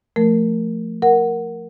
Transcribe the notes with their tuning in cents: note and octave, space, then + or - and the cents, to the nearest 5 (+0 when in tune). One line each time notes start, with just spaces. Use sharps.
F3 +0 A3 +15 A#4 -5
A#4 +0 F#5 +0